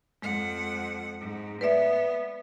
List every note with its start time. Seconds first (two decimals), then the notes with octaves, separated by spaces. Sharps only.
0.22 F2 G#3 F#5
1.20 G#2
1.61 B3 B4 D5 E5